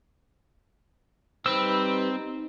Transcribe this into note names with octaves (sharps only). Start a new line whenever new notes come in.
G3 C4 D#4 B4 E6